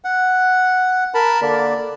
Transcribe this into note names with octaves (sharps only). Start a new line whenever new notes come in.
F#5
A#4 A5 B5
D3 A#3 D5